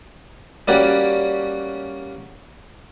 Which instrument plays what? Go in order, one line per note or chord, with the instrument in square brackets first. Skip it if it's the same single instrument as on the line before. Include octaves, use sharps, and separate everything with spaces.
[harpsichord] G3 A#3 C#4 F#4 G4 D5